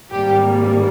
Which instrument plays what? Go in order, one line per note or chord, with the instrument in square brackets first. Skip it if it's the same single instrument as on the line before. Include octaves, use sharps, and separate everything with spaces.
[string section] G#1 G#2 G3 A#3 G4